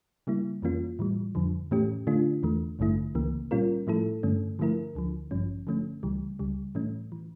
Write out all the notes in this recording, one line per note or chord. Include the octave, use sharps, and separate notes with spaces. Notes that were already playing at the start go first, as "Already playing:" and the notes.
C#3 G3 A#3 E4
F2 E3 A#3 C#4 F4
A2 E3 G3
F2 D3 F3
A2 E3 A3 C#4 G4
D3 A3 D4 F4
E2 E3 A3
A1 G2 D3 A3 E4
C#2 C#3 E3 A#3
A#2 G3 C#4 F4 A#4
A2 F3 A3 E4 A4
G2 D3 A3 C#4
D3 F3 A3 E4 A#4
D2 D3 F3
A1 G2 F3 C#4
D3 F3 A3 C#4
C#2 C#3 E3 G3
C#2 C#3 G3
A2 E3 A3 C#4
E3